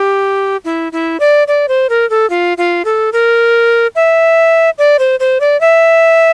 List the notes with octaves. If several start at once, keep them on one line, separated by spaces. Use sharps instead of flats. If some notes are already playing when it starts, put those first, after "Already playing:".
Already playing: G4
E4
E4
D5
D5
C5
A#4
A4
F4
F4
A4
A#4
E5
D5
C5
C5
D5
E5